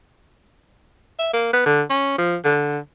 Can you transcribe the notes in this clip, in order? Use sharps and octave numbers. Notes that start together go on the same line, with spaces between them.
E5
A#3
B3
D3
C#4
F3
D3